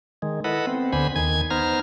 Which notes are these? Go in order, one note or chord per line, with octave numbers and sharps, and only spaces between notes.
D#3 G#3
E4 A4 B4 D#5 F#5
B3 C4
D2 D3 B3 C5 G#5 B5
D#2 D#3 G#5 G#6
B3 D#4 C5 A#5 F6